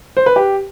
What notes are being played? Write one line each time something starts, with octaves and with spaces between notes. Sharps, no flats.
C5
B4
G4